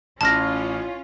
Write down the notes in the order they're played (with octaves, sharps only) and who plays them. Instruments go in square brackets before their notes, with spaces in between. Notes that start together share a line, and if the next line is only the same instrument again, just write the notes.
[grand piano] A1 F6 [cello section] C#4 F4 [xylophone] A5 A#6